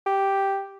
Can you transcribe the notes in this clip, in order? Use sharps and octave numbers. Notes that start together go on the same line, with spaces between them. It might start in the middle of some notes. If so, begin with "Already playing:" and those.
G4